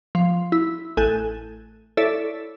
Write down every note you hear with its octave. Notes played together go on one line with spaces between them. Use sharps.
F3
E4
A1 A4 G#5 F#6 G6 D#7
E4 A4 C#5 D5 E5